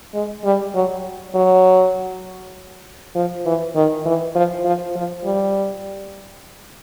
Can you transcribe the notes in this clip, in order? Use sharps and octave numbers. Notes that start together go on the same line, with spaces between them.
G#3
G3
F#3
F#3
F3
E3
D#3
E3
F3
F3
F3
G3